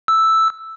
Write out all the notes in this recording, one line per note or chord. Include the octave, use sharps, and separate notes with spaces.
E6